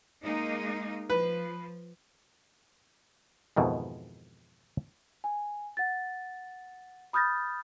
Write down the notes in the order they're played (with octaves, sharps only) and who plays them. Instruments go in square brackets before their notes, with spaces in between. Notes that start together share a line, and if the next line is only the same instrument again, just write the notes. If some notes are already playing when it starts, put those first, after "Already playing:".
[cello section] G#3 A#3 D#4
[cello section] F3 [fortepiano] B4
[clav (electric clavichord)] F2 G#2 B2 D#3 E3
[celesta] G#5
F#5 A6
B5 D#6 F6 G6 A6 A#6